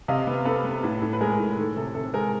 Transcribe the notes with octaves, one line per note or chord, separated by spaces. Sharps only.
C3 D#5 F5
B3
B3 A4 B4
B3
A2
A2
B4
G#3 G#4 A#4
A2
D#3 A4
C3 A4
C3 A4
G#3 G#4 A#4